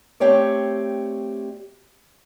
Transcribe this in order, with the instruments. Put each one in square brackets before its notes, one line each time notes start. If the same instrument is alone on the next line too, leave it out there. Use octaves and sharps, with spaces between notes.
[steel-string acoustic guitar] A3 C4 G4 C#5 D5